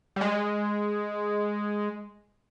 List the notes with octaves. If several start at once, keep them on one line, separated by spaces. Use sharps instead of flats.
G3
G#3